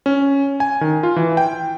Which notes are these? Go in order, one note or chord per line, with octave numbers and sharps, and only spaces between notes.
C#4
G#5
D#3
F4
E3
G5